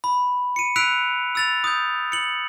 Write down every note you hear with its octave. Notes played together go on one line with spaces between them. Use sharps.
B5
C#7 D#7
E6 F#6 B6 D7 D#7 F7
E6 A6 F7
D#6 G6
C#7 F#7